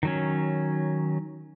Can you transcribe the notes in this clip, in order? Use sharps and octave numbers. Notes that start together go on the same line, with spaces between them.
D#3 F#3 C#4